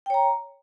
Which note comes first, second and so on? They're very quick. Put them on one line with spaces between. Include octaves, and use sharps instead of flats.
G5 C#5 A#5